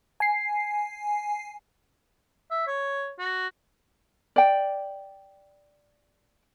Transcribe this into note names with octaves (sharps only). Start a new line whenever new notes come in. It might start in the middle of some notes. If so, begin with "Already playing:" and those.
G#5 C7
E5
C#5
F#4
D5 G5